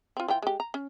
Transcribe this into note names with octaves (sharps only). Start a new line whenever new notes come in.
C4 F4
E3 F4 G5
G#3 G4
A#5
C#4